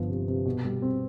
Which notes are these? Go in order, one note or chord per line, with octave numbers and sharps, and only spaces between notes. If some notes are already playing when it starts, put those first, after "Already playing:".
Already playing: G1 F3 B3
C3
C3
B2
G3
C4